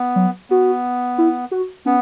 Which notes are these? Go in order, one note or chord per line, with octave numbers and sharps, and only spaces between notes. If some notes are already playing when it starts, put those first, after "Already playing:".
Already playing: B3
F#3
B3 F#4
E4
F#4
B3 C#4